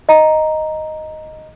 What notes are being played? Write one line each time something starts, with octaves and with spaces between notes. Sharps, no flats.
D#5 A#5